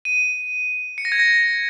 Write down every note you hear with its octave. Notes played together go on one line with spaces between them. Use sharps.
D#7
C#7
A#6
G#6
A#6